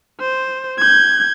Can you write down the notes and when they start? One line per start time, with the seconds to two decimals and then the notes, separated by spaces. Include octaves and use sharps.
0.20 C5
0.79 G6 G#6